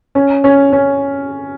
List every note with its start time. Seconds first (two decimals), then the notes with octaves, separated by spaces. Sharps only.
0.15 C#4
0.44 C#4
0.73 C#4